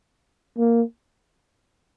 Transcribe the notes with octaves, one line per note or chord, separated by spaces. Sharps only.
A#3